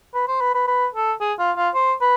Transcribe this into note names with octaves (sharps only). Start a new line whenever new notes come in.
B4
C5
B4
B4
B4
A4
G#4
F4
F4
C5
B4